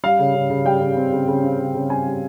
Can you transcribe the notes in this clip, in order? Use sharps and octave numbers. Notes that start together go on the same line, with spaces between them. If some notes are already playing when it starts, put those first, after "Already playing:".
G3 F5
C#3
C#3
C#3
G3 G5
C#3
C4
C#3
C#3
C4
C#3
C#3
G3 G#5
G3